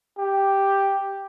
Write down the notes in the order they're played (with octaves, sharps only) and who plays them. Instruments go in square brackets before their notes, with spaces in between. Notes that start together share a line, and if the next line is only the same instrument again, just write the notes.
[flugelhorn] G4